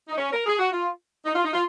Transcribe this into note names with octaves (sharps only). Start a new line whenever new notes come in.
D#4
C#4
A#4
G#4
F#4
F4
D#4
F4
D#4
F4